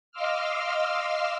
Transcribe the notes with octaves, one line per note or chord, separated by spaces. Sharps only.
D#5 F5 C6 D6 E6 F6